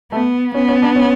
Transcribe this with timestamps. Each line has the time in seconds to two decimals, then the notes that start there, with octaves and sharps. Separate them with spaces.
0.12 A3 B3
0.54 B3 C#4
0.68 C#4
0.82 D4
0.96 C#4